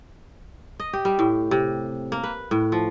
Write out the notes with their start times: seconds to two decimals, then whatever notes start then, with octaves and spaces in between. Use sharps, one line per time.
0.80 D#5
0.93 G4
1.05 G3
1.19 A2
1.51 C3
2.12 A#3
2.23 B4
2.51 A2
2.72 F3